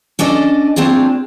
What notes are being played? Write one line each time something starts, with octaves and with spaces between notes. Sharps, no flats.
C#4 D4 A4 D5 D#5
A3 C4 D4 F4 G#4